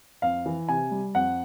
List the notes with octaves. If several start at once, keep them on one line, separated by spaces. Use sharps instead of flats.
F2 F5
E3
C3 G#5
G3
F2 F#5